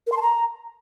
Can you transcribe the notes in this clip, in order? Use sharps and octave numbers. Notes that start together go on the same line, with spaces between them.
A#4
C6
A5
A#5